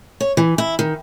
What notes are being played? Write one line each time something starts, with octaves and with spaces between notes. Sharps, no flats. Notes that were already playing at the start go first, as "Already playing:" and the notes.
C#5
E3
E4
D#3